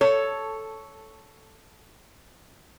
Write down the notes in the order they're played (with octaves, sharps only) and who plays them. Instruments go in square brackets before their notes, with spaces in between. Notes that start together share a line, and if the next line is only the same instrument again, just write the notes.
[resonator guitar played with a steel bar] A4 C#5